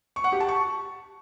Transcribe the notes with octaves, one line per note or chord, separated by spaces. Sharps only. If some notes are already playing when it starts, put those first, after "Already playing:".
C#6
F#5
G4
A5
C#6